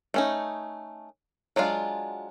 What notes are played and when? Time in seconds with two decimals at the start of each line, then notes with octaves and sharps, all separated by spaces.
0.14 A3 C#4 D#4
1.56 F#3 G#3 D4 F4